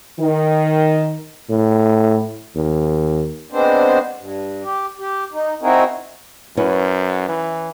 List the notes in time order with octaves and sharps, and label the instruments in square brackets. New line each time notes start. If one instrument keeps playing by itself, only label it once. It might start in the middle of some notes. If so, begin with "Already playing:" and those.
[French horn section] D#3
[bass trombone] A2
D#2
[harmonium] G#3 B3 C4 D4 C5
G2
G4
G4
D#4
C4 D#4 E4 F#4 G#4 A#4
[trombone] F#2 [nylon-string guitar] C#4 E4 B4
[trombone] E3